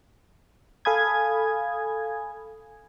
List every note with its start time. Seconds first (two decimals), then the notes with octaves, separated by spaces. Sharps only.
0.85 A4 F5 G#5 B5 D#6 G#6